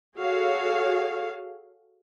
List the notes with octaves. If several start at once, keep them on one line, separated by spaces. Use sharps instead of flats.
F#4 G#4 A4 C#5 F5